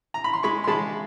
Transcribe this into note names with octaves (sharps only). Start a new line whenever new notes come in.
A#5
B5
C6
G#3 B5 C#6
C6
G#3 A5 B5